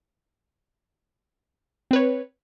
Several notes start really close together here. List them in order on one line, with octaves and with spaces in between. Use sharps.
C4 B4 C#5